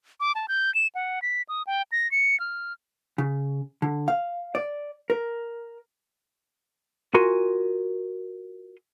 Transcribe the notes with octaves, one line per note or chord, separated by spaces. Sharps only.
D6
A5
G6
E7
F#5
B6
D#6
G5
A#6
C#7
F6
C#3
D3
F5
D5
A#4
F4 F#4 A#4 G#5 C6